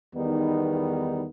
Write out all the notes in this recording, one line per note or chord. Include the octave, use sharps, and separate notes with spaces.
E2 D#3 G3 B3 D#4